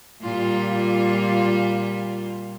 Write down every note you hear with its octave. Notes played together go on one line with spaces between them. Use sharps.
A#2 G3 F4